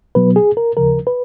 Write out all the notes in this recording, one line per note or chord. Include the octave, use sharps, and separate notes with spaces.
B2 F#3 B3 B4
G#4
A#4
D#2 C#3 F3 A#4
B4